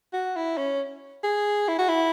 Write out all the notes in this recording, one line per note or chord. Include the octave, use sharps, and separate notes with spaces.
F#4
E4
C#4
G#4
E4
F#4
E4